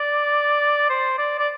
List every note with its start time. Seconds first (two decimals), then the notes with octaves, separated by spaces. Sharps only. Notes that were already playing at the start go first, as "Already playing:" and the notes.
Already playing: D5
0.90 C5
1.19 D5
1.39 D5